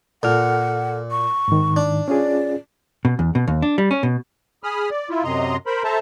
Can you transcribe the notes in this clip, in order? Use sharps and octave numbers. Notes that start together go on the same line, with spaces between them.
A#2 A4 F#5 F6
C#6
G#2 D#3
D4
C#4 F4 G#4 D5
B2
E2
B2
D#2
D4
G3
C#4
B2
G#4 B5 D#6 F6
D5
E4 F4
F#2 C3 D#5 A#5 C6
A#4 C5 B5
A4 C5 E5 A5 A#5